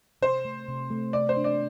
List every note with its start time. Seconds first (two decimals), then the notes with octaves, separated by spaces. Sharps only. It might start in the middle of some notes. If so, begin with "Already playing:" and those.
0.22 C3 C5
0.45 A3
0.68 C3
0.90 A3
1.13 C3 D5
1.29 C5
1.37 D4
1.44 D5